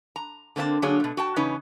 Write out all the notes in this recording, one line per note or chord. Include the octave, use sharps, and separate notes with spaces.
A#5
D3 A#3 C4 D4 A5
D3 F#3 A#3 D4 G#4 C#5
B2 A3
F#4 G5 A5
E2 C#3 C#4 D#4 B4